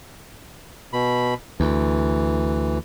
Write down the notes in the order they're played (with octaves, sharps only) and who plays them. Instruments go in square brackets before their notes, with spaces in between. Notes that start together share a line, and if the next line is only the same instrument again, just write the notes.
[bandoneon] B2 B5
[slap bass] D2 [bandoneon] E3